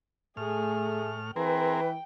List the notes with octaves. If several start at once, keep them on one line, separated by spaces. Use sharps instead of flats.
A2 A3 G#4 F6
E3 C4 G#4 A#4 B4 G5